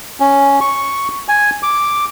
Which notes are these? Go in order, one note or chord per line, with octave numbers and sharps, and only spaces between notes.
C#4
C#6
G#5
D6